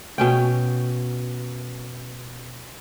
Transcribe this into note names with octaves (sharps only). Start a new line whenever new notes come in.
B2 C#4 G5